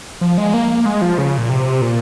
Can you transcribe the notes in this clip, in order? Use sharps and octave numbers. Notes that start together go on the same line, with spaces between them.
F3
G#3
A#3
G#3
F3
C#3
A#2
C3
A#2